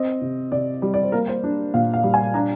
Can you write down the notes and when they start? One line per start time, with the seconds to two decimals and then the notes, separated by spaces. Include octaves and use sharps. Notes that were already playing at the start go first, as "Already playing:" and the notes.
Already playing: C4 D#5
0.21 C3
0.52 C3 D5
0.82 G3
0.94 D5
1.03 C5
1.12 A#3 A#4
1.28 C5
1.44 D4
1.74 A#2 F5
1.94 F5
2.03 G3
2.14 G#5
2.34 D4 A#5